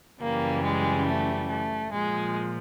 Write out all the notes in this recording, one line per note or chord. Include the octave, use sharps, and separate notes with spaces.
F#2 C#3 E3 G3 A#3
G#3
A3
A3
A#2 F3 G#3